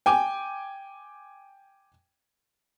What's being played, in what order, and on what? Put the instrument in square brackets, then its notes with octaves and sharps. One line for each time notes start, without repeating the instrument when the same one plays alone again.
[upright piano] G5 G#5 D6